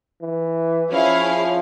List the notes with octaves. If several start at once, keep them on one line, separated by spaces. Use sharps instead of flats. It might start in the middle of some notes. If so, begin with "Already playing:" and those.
E3
F3 C#4 E4 G#4 C#5 F5